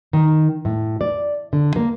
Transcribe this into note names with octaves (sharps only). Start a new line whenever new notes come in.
D#3
A2
D5
D3
A#3